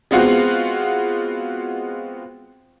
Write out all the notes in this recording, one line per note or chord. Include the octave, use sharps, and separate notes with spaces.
G#3 B3 C4 F4 F#4